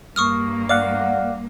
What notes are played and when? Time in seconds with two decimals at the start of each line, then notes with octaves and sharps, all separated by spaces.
0.16 G2 A#3 C#6 D#6 F6
0.69 D5 F5 F#5 D6